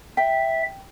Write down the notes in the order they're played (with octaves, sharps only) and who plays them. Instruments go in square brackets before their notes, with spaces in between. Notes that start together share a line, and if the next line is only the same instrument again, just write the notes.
[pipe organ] E5 [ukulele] G5